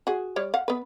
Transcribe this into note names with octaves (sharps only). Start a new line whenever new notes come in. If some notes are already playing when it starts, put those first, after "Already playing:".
F#4 G#4
G3 C#5 D5
F5 F#5
B3 B4